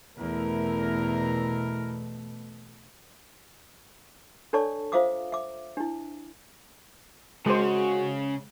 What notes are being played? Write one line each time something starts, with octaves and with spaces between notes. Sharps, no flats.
E2 B2 A3 E4 A#4
D4 A4 C#5 D5 A5 C#6
F4 C5 E5 F5 D6 D#6
E5 D6
D4 E4
C#3 G#3 F#4 C5